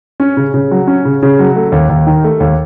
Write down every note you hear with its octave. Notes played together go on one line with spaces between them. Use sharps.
C#4
C#3
C#3
F#3
C#4
C#3
C#3
F#3
A3
D#2
D#2
D#3
A3
D#2